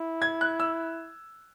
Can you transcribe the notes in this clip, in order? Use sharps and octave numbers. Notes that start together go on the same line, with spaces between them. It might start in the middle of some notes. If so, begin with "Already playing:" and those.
Already playing: E4
G#6
F#6
E6